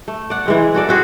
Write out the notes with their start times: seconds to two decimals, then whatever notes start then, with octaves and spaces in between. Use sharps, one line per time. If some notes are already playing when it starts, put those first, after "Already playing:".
0.08 A3
0.30 D5 F#5
0.46 E3 G#3 C4
0.74 F#4 A4 D5
0.89 C4 F#4 G#4